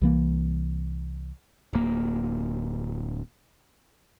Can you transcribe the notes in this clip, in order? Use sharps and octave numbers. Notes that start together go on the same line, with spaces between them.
C2 E3 A#3
D1 A#3